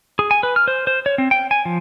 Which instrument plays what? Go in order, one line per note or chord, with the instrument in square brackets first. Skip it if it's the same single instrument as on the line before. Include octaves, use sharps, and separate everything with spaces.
[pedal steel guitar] G#4
G#5
B4
F6
C5
C5
C#5
C4
G5
G#5
F3